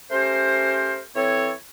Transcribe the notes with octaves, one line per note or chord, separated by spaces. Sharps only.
A3 C#4 G4 A#4 C5
E3 C4 A4 C#5